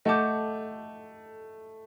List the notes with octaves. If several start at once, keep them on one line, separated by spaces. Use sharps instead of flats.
A3 D#5 F#5 A5 D6 G6